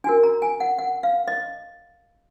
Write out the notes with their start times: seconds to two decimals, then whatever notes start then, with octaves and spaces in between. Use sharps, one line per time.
0.04 D4 F#4 A#4 G#5
0.23 A#5
0.42 G#5
0.60 F#5
0.78 F#5
1.03 F5
1.28 D#5